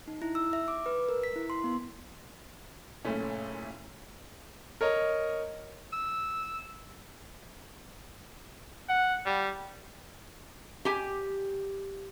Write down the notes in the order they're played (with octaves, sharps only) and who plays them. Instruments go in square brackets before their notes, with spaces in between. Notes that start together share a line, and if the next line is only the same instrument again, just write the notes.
[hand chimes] D#4
E4
E6
E5
D6
B4
A#4
B6
E4
C6
B3
[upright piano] F#1 A#2 A3 C#4
[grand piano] A#4 C#5 D#5
[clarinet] E6
[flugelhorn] F#5
G3
[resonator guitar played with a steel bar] G4 G#5